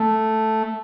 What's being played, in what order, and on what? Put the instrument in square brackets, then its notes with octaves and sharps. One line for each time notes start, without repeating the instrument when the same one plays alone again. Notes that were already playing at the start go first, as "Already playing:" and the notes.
Already playing: [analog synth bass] A3